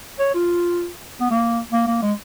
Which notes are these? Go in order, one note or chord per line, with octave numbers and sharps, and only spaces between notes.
C#5
F4
B3
A#3
A#3
A#3
G#3